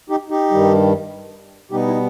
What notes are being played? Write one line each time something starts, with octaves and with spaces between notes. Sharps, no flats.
D#4 G4
D#4 G4
G2 D#3 G3
B2 G3 B3 D#4 G4
E4